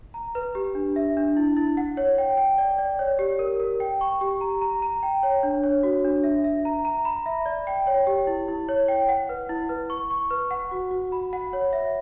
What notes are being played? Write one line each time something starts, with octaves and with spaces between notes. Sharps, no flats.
A#5
B4
G4
D4
E5
D4
E4
E4
F#5
C#5
G5
G5
D5
D5
C#5
G4
A#4
A#4
G5
C#6
G4
A#5
A#5
A#5
G5
C#5
D4
C#5
F#4
D4
E5
E5
A#5
A#5
B5
E5
D5
G5
C#5
G4
E4
E4
C#5
G5
F#5
B4
E4
B4
C#6
C#6
B4
F#5
F#4
F#4
B5
F#5
C#5
E5